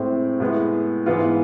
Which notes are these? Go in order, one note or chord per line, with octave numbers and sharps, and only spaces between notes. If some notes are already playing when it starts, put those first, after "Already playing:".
Already playing: A2 G#3 C4
A2 G#3 B3
G#2 E3 B3 F4